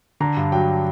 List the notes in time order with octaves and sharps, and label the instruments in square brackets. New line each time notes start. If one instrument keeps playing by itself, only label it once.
[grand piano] D3 A#5
G2
F#3 G5